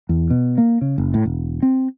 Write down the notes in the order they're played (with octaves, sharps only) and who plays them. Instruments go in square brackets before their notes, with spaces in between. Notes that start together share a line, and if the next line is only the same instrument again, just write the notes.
[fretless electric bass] E2
B2
A#3
C#3
F#1
A2
E1
C4